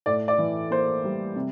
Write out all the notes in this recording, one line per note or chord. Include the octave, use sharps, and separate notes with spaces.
A2 D5
D5
E3
A#3 C5
G3
C3